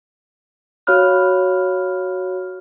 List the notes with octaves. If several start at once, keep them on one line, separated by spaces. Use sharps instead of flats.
F#4 C#5 F5 B5 F6 F#6